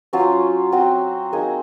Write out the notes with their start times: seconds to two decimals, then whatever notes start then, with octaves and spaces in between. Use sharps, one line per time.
0.13 F#3 C#4 F4 C5
0.72 F#3 C4 F#4
1.32 A#3 D#4 G#4